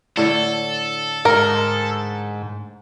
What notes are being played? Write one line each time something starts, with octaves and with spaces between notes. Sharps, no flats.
A2 D3 A4
G#2 A#4